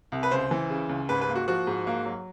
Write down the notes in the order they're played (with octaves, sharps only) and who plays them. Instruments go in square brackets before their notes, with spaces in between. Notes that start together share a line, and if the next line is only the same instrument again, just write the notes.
[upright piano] C2
B4
C#2 C5
E3
C#3
C#2
G#2 B4
B4
A#3
F#4
F3 F#4
G#2
A#3
F#3